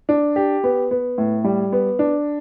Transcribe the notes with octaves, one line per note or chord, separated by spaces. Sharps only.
D4
G4
B3
B3
A2
G3
B3
D4